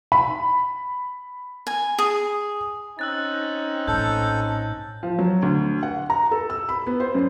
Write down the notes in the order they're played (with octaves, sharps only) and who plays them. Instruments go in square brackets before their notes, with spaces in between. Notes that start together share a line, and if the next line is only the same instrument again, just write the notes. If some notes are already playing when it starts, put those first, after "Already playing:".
[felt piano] B5
[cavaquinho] G#5
G#4
[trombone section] C4 C#4 D#4 [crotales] E6 F#6 A6
[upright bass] A#1 A2 [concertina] A4 [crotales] G6
[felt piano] F3
F#3
D2
F#5
A#5
A4
E6
B5
B3
C5
F#2